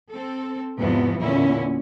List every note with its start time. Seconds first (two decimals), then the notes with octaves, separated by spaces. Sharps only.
0.10 C4 A4
0.78 E2 G#2 C3 E3 F3 B3
1.20 E2 A#2 D3 C#4 E4